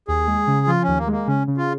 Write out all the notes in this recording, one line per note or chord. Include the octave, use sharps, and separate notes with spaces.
D#2 G#4
G#3
C#3
F3 F4
C#4
D#2
A#3
G#3
A#3
C#3 C#4
C#3
F4